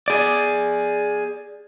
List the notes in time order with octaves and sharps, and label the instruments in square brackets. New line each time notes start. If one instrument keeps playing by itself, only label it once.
[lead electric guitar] G#4 D5